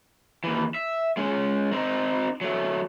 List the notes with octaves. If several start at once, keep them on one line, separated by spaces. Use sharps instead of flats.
D#2 E3
E5
G#3 C#4
C4 D#4
F#3 A3